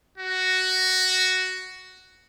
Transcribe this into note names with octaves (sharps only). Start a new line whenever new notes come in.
F#4